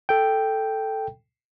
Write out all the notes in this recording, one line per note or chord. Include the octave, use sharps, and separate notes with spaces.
A4 G5